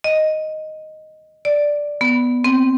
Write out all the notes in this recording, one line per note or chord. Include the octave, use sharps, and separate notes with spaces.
D#5
D5
B3
C4